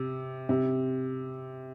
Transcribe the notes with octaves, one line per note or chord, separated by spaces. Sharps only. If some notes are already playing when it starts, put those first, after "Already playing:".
Already playing: C3
C3